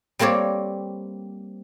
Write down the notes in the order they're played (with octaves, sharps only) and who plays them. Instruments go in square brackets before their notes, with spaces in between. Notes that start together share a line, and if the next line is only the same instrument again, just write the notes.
[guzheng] G3 A#3 C4 C#5 D5